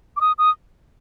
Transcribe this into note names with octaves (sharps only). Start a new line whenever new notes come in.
D6
D#6
D#6